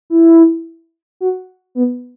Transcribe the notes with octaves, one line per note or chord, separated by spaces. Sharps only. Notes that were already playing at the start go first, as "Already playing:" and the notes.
E4
F#4
B3